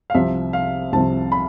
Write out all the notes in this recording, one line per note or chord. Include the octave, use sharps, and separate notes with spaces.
F5
C2 C3 F3 E5
F5
C2 C3 F3 A5
B5